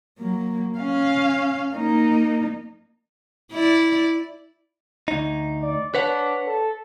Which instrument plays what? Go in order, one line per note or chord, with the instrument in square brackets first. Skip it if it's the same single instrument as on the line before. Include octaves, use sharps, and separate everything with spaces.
[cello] F#3 A#3
C#4 F5
A#3 D#4
[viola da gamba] E4 D5
[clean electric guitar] D2 D#4
[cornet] D5
[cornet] D4 [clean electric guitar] B4 C#5 F#5
[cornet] A4